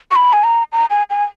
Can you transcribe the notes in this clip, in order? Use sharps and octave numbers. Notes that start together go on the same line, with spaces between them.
C#6
B5
G#5
A#5
A#5
G#5
G#5